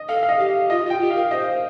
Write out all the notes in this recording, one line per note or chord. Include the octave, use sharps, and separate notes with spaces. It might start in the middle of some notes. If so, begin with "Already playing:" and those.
Already playing: D#5
A4 F5
F5
D#5
G4
F4 D#5
F4 G5
G4
F5
A#4
C5 D#5